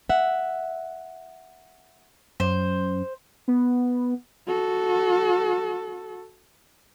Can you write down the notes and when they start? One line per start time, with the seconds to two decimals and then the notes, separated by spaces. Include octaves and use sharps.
0.09 E5 F#5
2.40 F#2 C5
3.48 B3
4.47 F#4 A4